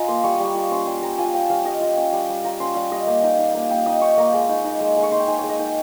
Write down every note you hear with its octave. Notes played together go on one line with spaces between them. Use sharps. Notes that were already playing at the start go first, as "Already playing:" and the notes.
Already playing: F4 D#5 G#5 A#5
A#3 C6
G3 C#6
D#6
G3 C#6
F4 C#6
C#4 C6
G3 C6
G3 A#5
F4 G#5
C#4 G5
G3 F5
G3 D#5
F4
C#4
G3
G3
F4 A#5
C#4 C6
G3 F5
G3 D#5
A#3
D#4
D#4
A#3
A#3 G5
D#4 D#6
D#4 C#6
A#3 A#5
G#3
D#4
D#4
G#3
G#3
C#6
D#4 C6
G5
D#4 G#5
C#5
G#3
D#5
D#4 G5